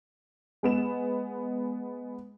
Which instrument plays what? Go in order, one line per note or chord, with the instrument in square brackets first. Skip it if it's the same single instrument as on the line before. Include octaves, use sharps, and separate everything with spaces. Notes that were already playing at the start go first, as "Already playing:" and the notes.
[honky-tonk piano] G#3 B3 E7